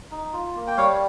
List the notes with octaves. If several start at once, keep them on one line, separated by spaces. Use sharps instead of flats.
D#4
F4
A#3
G5
G3 C#5 F5